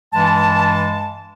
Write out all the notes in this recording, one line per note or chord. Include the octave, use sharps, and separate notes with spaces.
G2 E3 G#3 A5